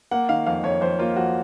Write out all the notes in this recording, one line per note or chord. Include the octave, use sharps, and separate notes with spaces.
A#3 F#5
D#3 F5
F2 F5
F2 C#5
F2 C5
A#3 F4
F2 F#4